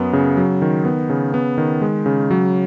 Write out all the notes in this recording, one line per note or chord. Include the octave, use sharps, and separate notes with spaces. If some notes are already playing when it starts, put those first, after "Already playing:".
Already playing: F#2 B3
C#3
F#3
D#3
B3
C#3
B3
D#3
G#3
C#3
F#3